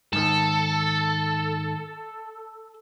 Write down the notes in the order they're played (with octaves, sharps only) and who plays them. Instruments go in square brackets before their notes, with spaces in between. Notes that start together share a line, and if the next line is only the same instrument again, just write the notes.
[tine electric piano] G#2 D#3 [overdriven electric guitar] A4